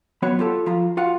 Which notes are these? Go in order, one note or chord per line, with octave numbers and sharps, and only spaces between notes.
F#3 B3 F#4 B4 C#5 B5
F4 G4 A4
F3 F4 F5 A#5
F4 F#4 F5 F#5